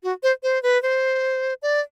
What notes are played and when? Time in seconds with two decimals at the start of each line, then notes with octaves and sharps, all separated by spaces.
0.03 F#4
0.23 C5
0.43 C5
0.63 B4
0.83 C5
1.62 D5